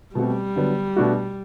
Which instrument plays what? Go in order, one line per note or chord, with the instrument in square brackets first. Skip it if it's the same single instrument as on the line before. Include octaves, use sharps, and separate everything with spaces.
[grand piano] B2 A3 C4 F#4 [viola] G3
[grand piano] D3 F#3 B3
B2 A3 D4 F#4